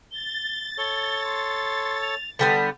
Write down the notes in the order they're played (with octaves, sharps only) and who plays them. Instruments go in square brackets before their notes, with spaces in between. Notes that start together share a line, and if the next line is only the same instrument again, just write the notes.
[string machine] A6 [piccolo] G7
[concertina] A4 C#5 [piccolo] G7
[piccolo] C6
F7
[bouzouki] D3 G3 B3 [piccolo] B6